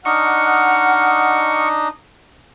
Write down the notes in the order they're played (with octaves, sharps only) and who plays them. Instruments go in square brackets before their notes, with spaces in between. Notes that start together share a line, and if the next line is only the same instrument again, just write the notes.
[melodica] D4 D#4 D#5 [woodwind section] F#5 [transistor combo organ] C#6 [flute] F6